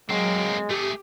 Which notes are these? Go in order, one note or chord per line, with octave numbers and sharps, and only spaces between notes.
F#3 G#3 A#3 C4
A3 G4 G#4